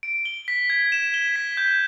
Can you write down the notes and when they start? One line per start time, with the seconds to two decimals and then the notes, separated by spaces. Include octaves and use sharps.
0.03 D7
0.25 G7
0.48 B6
0.70 G#6
0.92 E7
1.14 G7
1.36 B6
1.57 G6